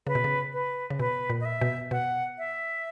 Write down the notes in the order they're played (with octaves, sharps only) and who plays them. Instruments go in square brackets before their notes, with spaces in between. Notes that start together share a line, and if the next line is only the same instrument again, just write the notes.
[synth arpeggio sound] C#3 [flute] B4
[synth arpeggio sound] B2
C#3
[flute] B4
[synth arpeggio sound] C#3
[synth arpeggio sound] B2 [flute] B4
[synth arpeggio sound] A#2
[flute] D#5
E5
[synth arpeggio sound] B2
[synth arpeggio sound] B2 [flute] F#5
[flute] E5